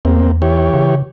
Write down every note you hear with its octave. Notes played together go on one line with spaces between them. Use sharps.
E2 A#3 C4
E3 G4 C#5
C#3